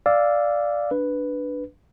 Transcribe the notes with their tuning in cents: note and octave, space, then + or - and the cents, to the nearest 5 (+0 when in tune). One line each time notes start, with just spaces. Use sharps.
D5 +0 F5 +0 E6 +0
D4 +0 B4 +0